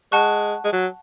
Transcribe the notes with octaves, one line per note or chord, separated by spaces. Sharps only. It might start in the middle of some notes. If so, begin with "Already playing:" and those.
G#3 F#5 A5 C#6 F#6
G#3
F#3